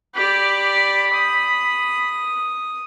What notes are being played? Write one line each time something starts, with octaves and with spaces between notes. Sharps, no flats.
G4 D5 B5
D#6